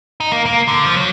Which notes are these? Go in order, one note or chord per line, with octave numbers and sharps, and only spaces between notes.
D#4
A#3
A#3
D3
F3
F#3